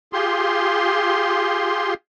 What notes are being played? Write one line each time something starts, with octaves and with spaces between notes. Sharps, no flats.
F4 G4 G#4 C6